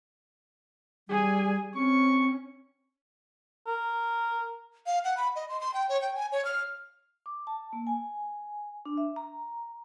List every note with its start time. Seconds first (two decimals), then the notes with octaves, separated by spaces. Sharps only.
1.09 G3 G#4 G#5
1.75 C4 C#4 C#6
3.67 A#4
4.86 F5
5.04 F#5
5.17 B5
5.36 D#5
5.49 C6
5.61 C6
5.74 G5
5.89 C#5
6.02 G5
6.16 G#5
6.32 C#5
6.45 F6
7.26 D6
7.47 A5
7.73 A#3
7.87 G#5
8.86 D4
8.97 E5
9.16 A#5